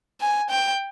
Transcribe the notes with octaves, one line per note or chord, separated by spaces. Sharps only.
G#5
G5